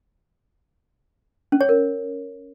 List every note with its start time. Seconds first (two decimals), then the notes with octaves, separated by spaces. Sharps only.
1.52 C#4
1.61 C#5
1.69 A#4